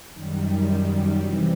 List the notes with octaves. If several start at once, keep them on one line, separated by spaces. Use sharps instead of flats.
F#2 D#3 G3
C3 E3 G3 C4